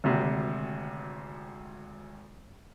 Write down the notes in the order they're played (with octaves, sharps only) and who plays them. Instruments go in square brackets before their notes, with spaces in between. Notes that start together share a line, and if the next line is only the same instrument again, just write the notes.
[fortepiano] G#1 D2 C3